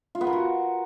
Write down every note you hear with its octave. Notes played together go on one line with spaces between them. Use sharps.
F4
B3
A#4
F#4